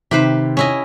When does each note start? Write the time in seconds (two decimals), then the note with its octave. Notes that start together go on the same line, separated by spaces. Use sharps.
0.11 C3 D#3 G4 B4 C5
0.57 C#4 E4 D#5